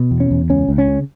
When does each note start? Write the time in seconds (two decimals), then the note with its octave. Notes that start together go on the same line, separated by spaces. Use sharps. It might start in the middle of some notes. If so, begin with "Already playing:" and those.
Already playing: B2
0.11 E2
0.20 C#4
0.31 E2
0.49 C#2 C#4
0.69 C#2
0.78 C#4
0.88 C#3